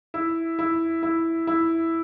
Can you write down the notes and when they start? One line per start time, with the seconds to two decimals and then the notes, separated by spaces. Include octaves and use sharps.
0.14 E4
0.59 E4
1.03 E4
1.47 E4